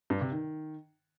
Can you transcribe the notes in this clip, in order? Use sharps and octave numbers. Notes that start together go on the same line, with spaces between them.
G2
C3
D#3